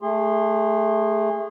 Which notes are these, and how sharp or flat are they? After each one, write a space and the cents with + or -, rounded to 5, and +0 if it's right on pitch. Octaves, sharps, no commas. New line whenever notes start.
A3 +0 G#4 -30 C6 +5